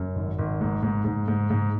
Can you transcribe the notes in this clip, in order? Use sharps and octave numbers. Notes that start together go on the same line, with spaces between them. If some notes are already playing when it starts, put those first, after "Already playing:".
Already playing: F#2
G#1
G#1
G#2
G#2
G#2
G#2
G#2